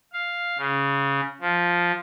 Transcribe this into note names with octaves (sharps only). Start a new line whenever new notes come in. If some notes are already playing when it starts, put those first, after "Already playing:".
F5
C#3
F3